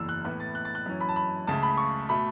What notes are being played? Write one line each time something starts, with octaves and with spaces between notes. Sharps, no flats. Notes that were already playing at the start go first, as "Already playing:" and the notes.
Already playing: F#1 E2 E3 E6
F#6
A2 E3 B3 E4 F#6
A6
F#6
A6
F#6
F#2 E3 C#4
B5
A5
B5
C#2 C#3 A3 A5
B5
C#6
B2 A3 B5